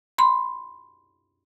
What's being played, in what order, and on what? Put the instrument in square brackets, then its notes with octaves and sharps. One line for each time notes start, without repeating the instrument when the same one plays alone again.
[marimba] B5 C6